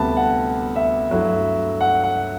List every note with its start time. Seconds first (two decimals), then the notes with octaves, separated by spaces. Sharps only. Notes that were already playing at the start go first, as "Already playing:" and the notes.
Already playing: D2 C3 G3 B3 A5 B5
0.17 F#5
0.75 E5
1.10 G2 F#3 A3 E4
1.81 F#5
2.04 F#5